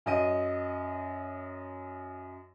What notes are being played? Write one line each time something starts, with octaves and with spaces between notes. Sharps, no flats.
F#2 D#5 D#7